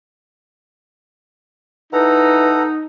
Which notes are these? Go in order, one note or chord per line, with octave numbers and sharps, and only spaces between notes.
E3 D#4 A4 F#5 A#5